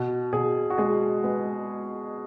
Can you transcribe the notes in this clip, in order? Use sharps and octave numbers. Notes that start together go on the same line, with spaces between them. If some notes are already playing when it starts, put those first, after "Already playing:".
Already playing: B2
B2 G#4
F#4
G#3 G#4
G#3 B4